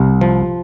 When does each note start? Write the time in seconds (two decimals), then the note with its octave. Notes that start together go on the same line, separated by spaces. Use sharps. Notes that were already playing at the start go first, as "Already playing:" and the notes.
Already playing: C2
0.21 F3